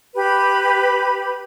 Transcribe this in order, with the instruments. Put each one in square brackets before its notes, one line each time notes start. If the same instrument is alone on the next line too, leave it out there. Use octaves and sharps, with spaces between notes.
[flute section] G4 B4 B5